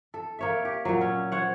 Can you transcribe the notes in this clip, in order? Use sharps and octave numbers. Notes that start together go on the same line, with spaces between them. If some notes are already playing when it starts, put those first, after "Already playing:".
A4
A#3 C#5 E5
G4
A#2 F#3
C#4
C5 C#5 F#5